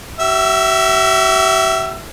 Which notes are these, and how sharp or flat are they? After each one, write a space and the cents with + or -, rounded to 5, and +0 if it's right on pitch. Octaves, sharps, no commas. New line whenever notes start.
F#4 +45 E5 +0 E6 +35